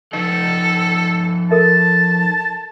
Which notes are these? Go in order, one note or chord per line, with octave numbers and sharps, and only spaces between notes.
F3 D#4 A4 D#5
A4 A#4 E5 A5